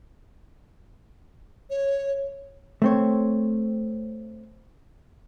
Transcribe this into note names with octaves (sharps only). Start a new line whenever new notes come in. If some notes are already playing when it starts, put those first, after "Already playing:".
C#5
A3 C4 C#5